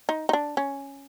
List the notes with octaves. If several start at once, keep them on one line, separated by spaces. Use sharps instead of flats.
D#4
D#4
D4
C#4